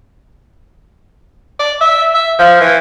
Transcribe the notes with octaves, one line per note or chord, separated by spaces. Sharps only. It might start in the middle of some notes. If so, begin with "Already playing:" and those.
D5
E5
E5
F3
E3